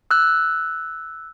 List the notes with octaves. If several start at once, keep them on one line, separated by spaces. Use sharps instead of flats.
E6 F#6